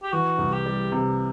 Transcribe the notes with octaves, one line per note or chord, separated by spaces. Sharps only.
G4
E3 F#4
C2
G4
G3
C3